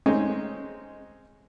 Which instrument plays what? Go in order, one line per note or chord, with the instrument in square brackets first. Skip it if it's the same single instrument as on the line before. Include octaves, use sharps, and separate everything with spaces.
[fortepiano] G#3 C4 C#4 D#4